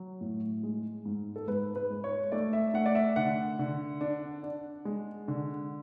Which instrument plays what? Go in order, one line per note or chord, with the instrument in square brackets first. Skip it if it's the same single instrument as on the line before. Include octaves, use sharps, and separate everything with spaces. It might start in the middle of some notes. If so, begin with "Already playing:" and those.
Already playing: [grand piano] F#3
A2
G#3
G#2
A4
G#2 B4
B4
G#3
C#5
A3 D5
E5
A3 F#5
D5
E5
D3 F#5
D3
D4
D4
G#3
D3